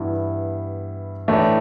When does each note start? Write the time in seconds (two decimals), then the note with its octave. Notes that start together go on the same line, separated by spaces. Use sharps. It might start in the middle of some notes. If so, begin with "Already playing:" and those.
Already playing: G2 E3 B3 E4
1.28 A2 E3 A3 D4